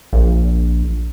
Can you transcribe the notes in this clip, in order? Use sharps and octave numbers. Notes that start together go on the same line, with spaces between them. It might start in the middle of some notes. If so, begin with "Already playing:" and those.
A#1